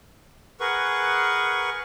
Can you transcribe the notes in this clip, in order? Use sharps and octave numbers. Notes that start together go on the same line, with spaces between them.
G#4 A#4 B4 F#5 C#6